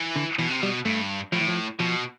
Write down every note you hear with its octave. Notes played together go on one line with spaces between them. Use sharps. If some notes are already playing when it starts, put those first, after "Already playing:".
Already playing: E3
D3
B2 E3
C3
B2 G3
G2 A3
A2 F3
E3
F3
B2 F3